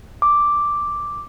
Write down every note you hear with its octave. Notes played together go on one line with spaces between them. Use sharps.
D6